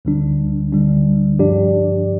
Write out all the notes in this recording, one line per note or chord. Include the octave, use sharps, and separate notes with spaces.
D2 D3 G3 D4
D2 D3 G3 D4
G2 F3 D4 G4 D5